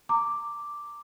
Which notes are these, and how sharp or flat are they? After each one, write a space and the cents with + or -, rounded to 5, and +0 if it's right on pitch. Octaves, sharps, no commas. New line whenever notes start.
A#5 -25 D6 +0